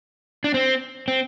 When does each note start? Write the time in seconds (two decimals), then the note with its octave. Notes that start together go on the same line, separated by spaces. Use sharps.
0.44 D4
0.54 C4
1.08 C4